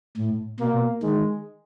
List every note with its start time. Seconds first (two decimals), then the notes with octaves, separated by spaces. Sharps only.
0.17 A2
0.60 B2 A#3
1.03 D#3 G#3